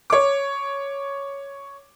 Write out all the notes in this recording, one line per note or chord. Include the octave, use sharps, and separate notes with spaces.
C#5 D6